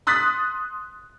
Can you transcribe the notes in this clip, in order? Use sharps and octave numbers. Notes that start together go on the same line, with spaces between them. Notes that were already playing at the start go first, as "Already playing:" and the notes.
C6 D#6 F#6 A6 B6